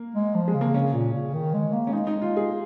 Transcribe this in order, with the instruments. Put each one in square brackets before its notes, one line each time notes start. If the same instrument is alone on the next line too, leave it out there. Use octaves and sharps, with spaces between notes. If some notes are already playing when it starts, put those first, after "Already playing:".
Already playing: [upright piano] A#3
[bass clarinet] G#3
F3
[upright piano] G#3
[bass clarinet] C#3
[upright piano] A#3
[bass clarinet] C#3 [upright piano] C#4
[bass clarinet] A#2
C#3
D#3
G#3
A#3
[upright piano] C#4
[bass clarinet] G#3 [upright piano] D#4
[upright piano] D#4
F4
G#4